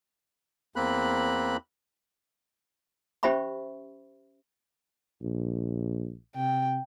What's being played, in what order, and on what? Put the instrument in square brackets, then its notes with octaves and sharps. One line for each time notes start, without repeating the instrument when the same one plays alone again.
[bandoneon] E2 A#3 C4 B5 F#6
[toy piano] C#4 G4 C5 E5 B5 C#6
[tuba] A#1
[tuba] C3 [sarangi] G5